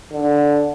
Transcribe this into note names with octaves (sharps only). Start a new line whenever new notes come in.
D3